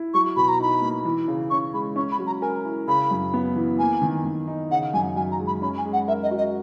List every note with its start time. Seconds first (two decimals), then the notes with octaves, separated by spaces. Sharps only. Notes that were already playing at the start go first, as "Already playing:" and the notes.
Already playing: E4
0.14 F#3 C#6
0.36 B2 B5
0.48 A#5
0.60 D#4 B5
0.82 A#3
1.05 E3
1.28 C#3
1.50 C#4 C#6
1.74 G#3 B5
1.96 C#4 C#6
2.12 B5
2.19 F#3
2.27 A#5
2.42 A#4 G#5
2.64 E4
2.88 C#3 B5
3.11 F#2
3.34 B3
3.56 E3
3.79 A#3 G#5
4.02 D#3
4.25 D#3
4.48 D#4
4.71 C#3 F#5
4.93 F#2 G#5
5.16 F#2 G#5
5.31 A#5
5.40 G#3
5.47 B5
5.62 C#4 B5
5.78 G#5
5.85 G#3
5.93 F#5
6.08 A#4 E5
6.23 D#5
6.31 F#4
6.38 D#5